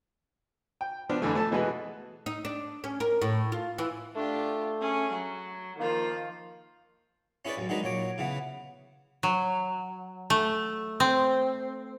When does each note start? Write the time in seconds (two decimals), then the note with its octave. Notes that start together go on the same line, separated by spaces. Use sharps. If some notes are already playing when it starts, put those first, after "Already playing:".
0.81 G5
1.09 F3 B3 D4 F6
1.22 F2 D3 E3 A3
1.35 A3 A4 A5
1.51 B2 E3 G#3 F#4 B4
2.26 D#4
2.45 D4
2.84 C#4
3.00 A#4
3.22 A2
3.52 F4
3.78 E3
4.16 A3 D4 F4 G4
4.81 C#4 G#4
5.14 F#3
5.80 D#3 F3 A#3 F4
7.45 C#4 E4 G#4 B4 C#5 D5
7.57 A1 F#2
7.69 D#3 F#3 G#3 D4 D#4 B4
7.83 A#2 F#3 C#5 D6
8.18 C#3 E3 B3
9.23 F#3
10.30 A3
11.00 C4